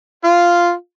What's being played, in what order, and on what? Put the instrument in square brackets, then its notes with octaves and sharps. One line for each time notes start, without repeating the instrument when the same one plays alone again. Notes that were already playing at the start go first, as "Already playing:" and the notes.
[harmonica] F4 F5